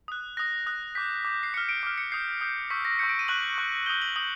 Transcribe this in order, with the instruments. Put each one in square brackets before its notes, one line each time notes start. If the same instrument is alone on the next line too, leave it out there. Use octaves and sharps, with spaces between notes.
[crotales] D#6 F#6
D#6 F#6 A#6
D#6 F#6
D6 G6 B6
D6 G6
C7
D6 F6 C#7
D7
D6 F6 D7
C#7
D#6 G6 C7
D#6 G6
C#6 E6 G6 B6
A#6
C#6 E6 G6 C#7
D7
D#7
C#6 F#6 F#7
C#6 F#6
D#6 G6 G7
F#7
D#6 G6 F#7